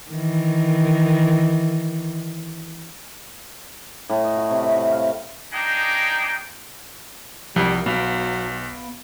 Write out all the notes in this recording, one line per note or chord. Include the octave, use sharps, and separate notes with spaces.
D#3 E3
A2
D#5
F#4
C3
E5
F#4
F5
A#3 D4 D#4 G#4 G5 A#5
C2 F3 G3 A#4
B1 F#3 B3 F5 G5